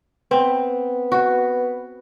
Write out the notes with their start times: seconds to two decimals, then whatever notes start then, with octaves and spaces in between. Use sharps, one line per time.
0.31 B3 C4
1.12 F#4